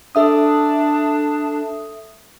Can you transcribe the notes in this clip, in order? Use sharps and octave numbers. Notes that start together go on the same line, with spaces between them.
D4 A4 E5 D#6